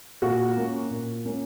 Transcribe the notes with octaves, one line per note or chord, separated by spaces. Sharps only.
A#2 F#4
A#3 C#4
A#2
A#3 C#4